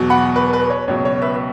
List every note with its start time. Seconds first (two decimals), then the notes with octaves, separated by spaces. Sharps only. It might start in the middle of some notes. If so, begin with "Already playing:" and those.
Already playing: E2 B2 F#3
0.10 F#5 B5
0.36 B4
0.53 B4
0.70 C#5
0.88 C#2 B2 F#3 C#5
1.05 C#5
1.22 B4 E5